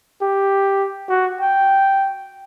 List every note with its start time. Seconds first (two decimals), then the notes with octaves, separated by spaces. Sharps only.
0.21 G4
1.09 F#4
1.41 G5